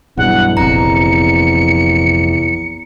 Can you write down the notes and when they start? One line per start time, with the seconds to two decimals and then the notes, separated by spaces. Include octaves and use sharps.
0.18 B1 E2 G2 F#5
0.57 F1 A#1 F2 A#5 C#7